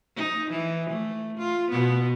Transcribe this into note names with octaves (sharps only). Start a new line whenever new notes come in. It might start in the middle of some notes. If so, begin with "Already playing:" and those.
D#4
E3
A3
F4
B2 B3